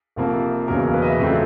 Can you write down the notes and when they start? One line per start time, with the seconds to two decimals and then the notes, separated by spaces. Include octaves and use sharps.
0.16 F1 F2 C3 F3 A#3
0.68 E1 E2 C#3 F#3 A#3 A#4
0.81 A#4
0.94 B4
1.02 D#5
1.06 E5
1.19 F2 C#3 F#3 A3 C4